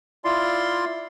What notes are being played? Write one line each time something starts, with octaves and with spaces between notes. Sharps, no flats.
E4 F4 D5 C6